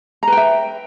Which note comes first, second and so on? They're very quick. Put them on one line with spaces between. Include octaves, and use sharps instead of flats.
A#5 B4 G5 E5